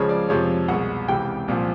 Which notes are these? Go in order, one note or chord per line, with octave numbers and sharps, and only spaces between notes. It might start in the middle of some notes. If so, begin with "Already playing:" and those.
Already playing: C#2 C#3 F3 G#3 C#5
D5
F2 C3 F3 G#3 C#5
C2 B2 G#3 F#5
C#2 C3 E3 G5
C2 A#2 F3